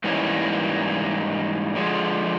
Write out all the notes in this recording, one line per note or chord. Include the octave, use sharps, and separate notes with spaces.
G#2 E3 G3 A#3 C#4
D3 F3 G#3